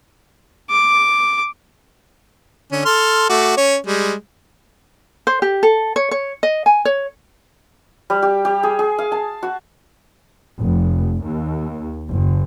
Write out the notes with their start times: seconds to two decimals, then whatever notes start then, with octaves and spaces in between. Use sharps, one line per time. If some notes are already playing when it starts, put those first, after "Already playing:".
0.70 D6
2.72 D3 C#4
2.85 A4 C6 F6
3.29 A3 F#4 D6
3.57 C#4 C#5
3.87 G3 G#3
5.27 C5
5.42 G4
5.63 A4
5.96 C#5
6.11 C#5
6.43 D#5
6.66 G#5
6.85 C#5
8.10 G3
8.22 G4
8.45 G4
8.63 G#4
8.79 G#4
8.99 F5
9.12 A5
9.43 F#4
10.59 F1
11.23 D#2
12.09 F#1